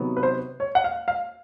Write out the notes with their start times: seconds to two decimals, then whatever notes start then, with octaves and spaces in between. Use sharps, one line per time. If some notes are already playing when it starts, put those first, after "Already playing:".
Already playing: C3 D#3 F#3 B3
0.17 B4
0.23 C5
0.60 C#5
0.75 F#5
0.84 F5
1.08 F5